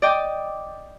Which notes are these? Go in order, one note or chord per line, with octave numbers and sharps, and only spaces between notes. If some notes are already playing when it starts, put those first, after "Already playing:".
D5 D#5 G5 D6